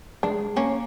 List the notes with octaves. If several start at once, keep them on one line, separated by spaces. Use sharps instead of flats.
G#3 D4
A#3 C#4